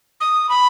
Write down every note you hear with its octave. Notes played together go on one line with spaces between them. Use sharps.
D#6
B5